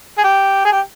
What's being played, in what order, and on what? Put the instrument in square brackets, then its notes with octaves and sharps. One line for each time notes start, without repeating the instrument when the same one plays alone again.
[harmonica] G#4
G4
G#4
G4